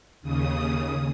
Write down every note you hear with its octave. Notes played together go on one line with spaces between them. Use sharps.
D#2 C#3 D#6